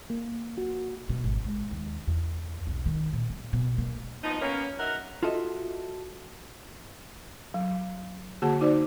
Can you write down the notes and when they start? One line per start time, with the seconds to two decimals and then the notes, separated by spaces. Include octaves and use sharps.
0.10 A#3
0.58 F#4
1.10 B2
1.24 G#1
1.44 G#3
1.71 D#2
2.07 E2
2.67 B1
2.86 D#3
3.13 A#2
3.30 B3
3.53 B2
3.78 A#3
4.23 F3 B3 D#4
4.41 A#3 B3 C#4
4.79 F#3 D#4 A#4 E5 F#5
5.23 F4 F#4 A4 D#5 E5
7.54 F#3
8.42 D3 A#3 F#4 G#4 F#5 A5
8.61 D#4 F#4 C5 D5